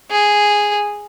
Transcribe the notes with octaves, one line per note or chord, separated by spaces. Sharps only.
G#4